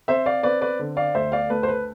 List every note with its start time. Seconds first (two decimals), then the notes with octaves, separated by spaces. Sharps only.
0.08 C4 C5 E5
0.26 D5 F5
0.43 C4 B4 D5
0.61 B4 D5
0.79 D3
0.97 D5 F5
1.15 D2 C5 E5
1.32 D5 F5
1.50 A3 B4
1.63 C5
1.68 B4